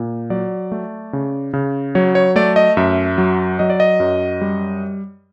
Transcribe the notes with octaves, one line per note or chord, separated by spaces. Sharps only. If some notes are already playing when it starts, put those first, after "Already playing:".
Already playing: A#2
F#3 D5
A3
C#3
C#3
F#3 C#5
C#5
A3 D5
D#5
F#2 E5
F#3
F#3 D#5
D5
D#5
F#2
G3